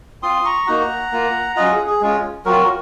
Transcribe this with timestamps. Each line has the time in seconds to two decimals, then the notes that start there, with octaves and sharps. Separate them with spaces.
0.22 C4 F4 C6 D#6
0.45 A#5 C#6
0.67 A#3 D#4 F#4 F#5 A#5
1.12 A#3 F4
1.56 F#3 C#4 F4 D#5 F#5
1.72 G#4
1.86 G#4
2.01 G#3 C#4 F4
2.45 F#3 C4 F4 F#4 A#4